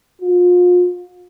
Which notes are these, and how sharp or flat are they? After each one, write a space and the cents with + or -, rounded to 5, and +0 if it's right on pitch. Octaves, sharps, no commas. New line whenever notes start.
F4 +35